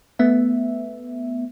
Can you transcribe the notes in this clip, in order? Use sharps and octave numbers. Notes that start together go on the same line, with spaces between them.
A3 B3 E5